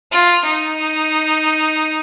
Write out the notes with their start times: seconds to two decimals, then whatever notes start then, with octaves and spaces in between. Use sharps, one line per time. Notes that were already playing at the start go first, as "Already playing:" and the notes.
0.12 F4
0.45 D#4